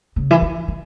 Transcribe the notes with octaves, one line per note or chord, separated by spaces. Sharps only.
C#3
E3
D#3
D#3